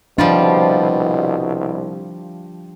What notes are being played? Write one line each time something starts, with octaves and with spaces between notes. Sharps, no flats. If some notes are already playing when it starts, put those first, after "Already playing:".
C2 B2 F3 G3 D4 F4